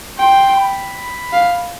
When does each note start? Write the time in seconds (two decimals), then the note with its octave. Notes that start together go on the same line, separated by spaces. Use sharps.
0.18 G5 C6
0.56 B5
1.33 F5